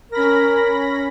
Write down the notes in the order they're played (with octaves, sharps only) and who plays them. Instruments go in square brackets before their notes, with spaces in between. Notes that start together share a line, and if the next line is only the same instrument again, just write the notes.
[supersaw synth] C#4 B5 A#6 [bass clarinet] A#4